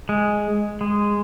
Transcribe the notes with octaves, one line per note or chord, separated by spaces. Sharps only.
G#3
G#3